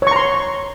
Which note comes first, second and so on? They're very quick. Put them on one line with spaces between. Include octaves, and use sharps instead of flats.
C#5 C#6 A#5 C6